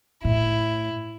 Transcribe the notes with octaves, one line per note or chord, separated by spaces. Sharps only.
A2 E4